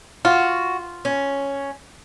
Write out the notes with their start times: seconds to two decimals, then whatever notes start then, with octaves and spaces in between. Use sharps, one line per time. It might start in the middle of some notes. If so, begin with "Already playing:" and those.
0.25 F4 F#4
1.05 C#4